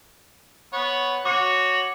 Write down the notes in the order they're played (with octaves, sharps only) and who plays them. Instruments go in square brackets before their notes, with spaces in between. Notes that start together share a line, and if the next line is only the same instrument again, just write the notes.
[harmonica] B3 C#5
[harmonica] F#4 C#5 [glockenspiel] D6 C#7